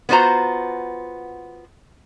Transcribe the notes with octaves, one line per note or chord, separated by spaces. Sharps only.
B3 F4 F#4 C5 A#5